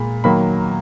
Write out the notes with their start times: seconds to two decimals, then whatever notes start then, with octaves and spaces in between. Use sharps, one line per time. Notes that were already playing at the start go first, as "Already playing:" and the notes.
Already playing: A#2 G#3 B5
0.24 D#3 F#3 A#3 B5